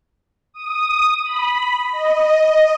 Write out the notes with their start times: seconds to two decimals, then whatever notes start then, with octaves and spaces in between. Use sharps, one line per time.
0.53 D#6
1.23 B5
1.91 D#5